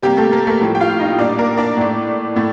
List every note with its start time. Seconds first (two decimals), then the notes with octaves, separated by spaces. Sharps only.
0.03 C3 G3 A#3 G4
0.17 A3 A4
0.32 A#3 A#4
0.47 A3 A4
0.61 A2 F3 G3 A#3 G4
0.75 G5
0.80 F4 F5
1.00 D#4 D#5
1.19 A#2 G3 A#3 D4 D5
1.38 A#3 A#4
1.58 D4 D5
1.77 A2 A3
2.36 A2 A3